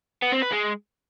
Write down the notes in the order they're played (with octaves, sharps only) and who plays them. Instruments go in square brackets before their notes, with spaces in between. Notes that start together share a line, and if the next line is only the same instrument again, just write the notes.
[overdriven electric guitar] B3
C4
B4
G#3